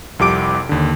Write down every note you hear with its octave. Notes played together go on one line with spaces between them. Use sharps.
C2 F2 G4 D6 D7
D#2 D3